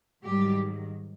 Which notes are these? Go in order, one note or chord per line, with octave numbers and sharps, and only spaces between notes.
G#2 D#3 F#3 G3 G4